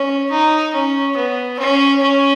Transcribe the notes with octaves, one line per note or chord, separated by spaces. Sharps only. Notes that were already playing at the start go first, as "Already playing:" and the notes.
Already playing: C#4
D#4
C#4
B3
C#4
C#4